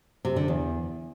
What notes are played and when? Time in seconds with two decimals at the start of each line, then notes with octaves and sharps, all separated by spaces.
0.25 C3
0.36 D3
0.48 E2